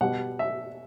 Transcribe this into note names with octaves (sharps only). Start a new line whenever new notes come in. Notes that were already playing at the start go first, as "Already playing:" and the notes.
B2 G3 F#5
E5